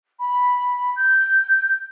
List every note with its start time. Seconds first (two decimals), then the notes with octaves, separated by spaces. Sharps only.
0.19 B5
0.96 G6